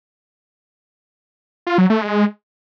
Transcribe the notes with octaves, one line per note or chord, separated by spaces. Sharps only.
F4
F#3
A3
G#3